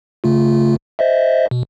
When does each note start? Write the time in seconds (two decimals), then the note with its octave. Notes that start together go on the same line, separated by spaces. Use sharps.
0.24 C#3 A3 F4
0.99 C5 D#5 E5
1.51 B2